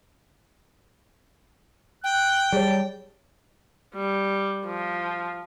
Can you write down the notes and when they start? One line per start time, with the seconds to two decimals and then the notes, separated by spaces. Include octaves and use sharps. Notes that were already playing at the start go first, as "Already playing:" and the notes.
2.04 G5 F#6
2.53 G3 G#4 C#5 A5
3.95 G3
4.66 F3